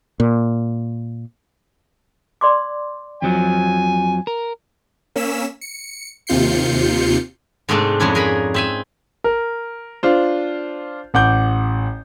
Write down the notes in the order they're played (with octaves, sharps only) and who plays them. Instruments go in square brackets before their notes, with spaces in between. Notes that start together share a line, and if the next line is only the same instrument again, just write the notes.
[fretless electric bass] A#2
[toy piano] D5 C6 D6
[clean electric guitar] F2 F3 F#3 [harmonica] G#5
[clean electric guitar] A#4
[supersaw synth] A#3 C#4 E6 B6 E7
C#7
D#2 C3 F4 G6 C7 C#7
[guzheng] G#2 C3 G#3 A3 C4 D4
F2 G#3 C#4 D4 E4
G#4 A#4 G#5 A#5 B5
C4 E5 G#5
[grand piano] A#4
D4 F4 C5
A1 F#5 D6 G6